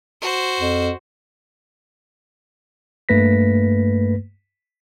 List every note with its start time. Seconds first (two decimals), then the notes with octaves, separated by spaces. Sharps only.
0.21 F#4 C5
0.60 F2
3.09 G2 A3 A#3 B4 A#6 B6